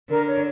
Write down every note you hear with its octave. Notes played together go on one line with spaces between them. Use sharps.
D3 A#4
C#5